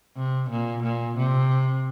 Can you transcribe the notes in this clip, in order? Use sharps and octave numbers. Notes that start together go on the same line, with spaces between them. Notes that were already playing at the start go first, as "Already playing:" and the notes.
C3
A#2
A#2
C3